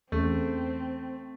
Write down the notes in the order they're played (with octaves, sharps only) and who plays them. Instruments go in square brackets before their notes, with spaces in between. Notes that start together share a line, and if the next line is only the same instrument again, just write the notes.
[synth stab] E2 [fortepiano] A3 [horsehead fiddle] C4 [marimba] C#4 G#4 A4